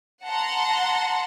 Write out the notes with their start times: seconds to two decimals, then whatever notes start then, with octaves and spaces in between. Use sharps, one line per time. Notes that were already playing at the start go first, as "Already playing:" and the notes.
0.24 F#5 A5 A#5 C6